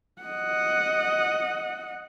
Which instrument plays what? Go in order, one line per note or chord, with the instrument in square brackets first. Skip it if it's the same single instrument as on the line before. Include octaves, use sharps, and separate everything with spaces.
[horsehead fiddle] D#5 F#5